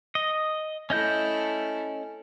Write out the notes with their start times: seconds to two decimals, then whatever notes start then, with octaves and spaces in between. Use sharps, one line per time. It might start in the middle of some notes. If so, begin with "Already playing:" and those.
0.15 D#5
0.90 A3 C#4 E4 D#5 G6